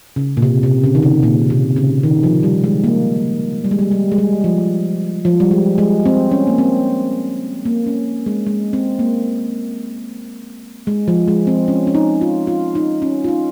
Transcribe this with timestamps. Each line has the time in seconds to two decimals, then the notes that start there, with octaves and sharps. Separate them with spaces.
0.16 C#3
0.37 A#2
0.42 C3
0.63 C3
0.84 C#3
0.95 D#3
1.02 C#3
1.23 A#2
1.50 C3
1.76 C#3
2.03 D#3
2.23 F3
2.43 G3
2.64 G#3
2.84 A#3
3.64 G3
3.71 G#3
3.79 G3
3.91 G3
4.11 G#3
4.18 G3
4.44 F3
5.25 F3
5.40 G3
5.51 G#3
5.78 G#3
6.06 C4
6.31 C#4
6.47 A#3
6.58 C4
7.65 A#3
7.86 C#4
8.26 G#3
8.47 G#3
8.73 C4
8.99 A#3
10.87 G#3
11.08 F3
11.28 G#3
11.47 C4
11.68 C#4
11.87 C#4
11.95 D#4
12.21 F4
12.47 F4
12.75 D#4
13.02 C#4
13.24 F4
13.28 D#4